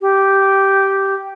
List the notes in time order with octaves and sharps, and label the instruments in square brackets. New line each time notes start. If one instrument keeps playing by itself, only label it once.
[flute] G4